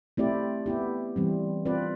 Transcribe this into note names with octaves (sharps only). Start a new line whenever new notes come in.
A3 C4 E4 G4 D5
B3 E4 G4
E3 G3 C4
C4 F4 B4 D5